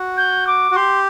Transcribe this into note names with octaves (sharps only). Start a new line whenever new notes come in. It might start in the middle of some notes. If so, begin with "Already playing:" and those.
Already playing: F#4
G6
D6
F#4
G4 C6